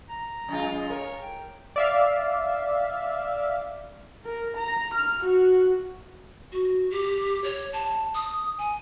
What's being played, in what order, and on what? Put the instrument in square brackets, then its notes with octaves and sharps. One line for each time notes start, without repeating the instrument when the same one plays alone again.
[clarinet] A#5
[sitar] F#2 G#3 F4
[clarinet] D#5
[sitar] A#4 [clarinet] C#5
[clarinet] G5
[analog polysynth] D5 E5 F5
[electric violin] A#4
A#5
F6
F#4
[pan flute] F#4
G4
C#5
A5
D#6
G#5